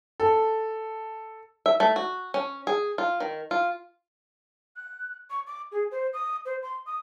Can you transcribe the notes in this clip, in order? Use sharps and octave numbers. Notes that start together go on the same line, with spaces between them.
A4
E5
A3
F#4
C#4
G#4
F4
D#3
F4
F#6
C#6
D6
G#4
C5
D#6
C5
C6
D#6